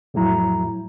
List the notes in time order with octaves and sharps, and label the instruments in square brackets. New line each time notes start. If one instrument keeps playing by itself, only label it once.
[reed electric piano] F2 A2 F#3 E4 A#5